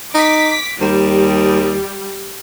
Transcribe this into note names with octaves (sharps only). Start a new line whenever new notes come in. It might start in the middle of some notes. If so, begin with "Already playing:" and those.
D#4 D6 B6
D#2 G3